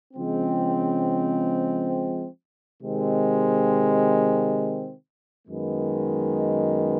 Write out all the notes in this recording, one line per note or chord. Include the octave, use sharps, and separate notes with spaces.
C#3 F3 G#3 C4
C3 D#3 G#3 C4
F#2 D#3 G#3 B3